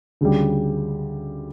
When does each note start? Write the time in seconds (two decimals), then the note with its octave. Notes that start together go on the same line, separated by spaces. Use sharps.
0.21 D2 C#3 G3